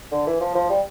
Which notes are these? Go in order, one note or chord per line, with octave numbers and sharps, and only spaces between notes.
D3
E3
F3
F3
G3